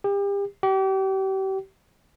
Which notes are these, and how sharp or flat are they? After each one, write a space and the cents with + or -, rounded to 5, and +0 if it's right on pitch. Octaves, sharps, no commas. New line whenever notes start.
G4 +35
G4 -35